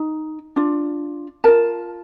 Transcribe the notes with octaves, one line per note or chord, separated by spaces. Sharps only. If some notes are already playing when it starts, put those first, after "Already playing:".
Already playing: D#4
D4 F4
F4 A#4 A5